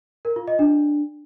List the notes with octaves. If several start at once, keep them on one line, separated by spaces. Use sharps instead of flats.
A#4
F4
D#5
D4